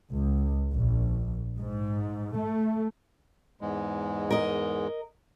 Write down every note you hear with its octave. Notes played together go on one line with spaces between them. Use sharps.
C#2
A#1
G#2
A3
E2 G#2 G#3
A#4 D#5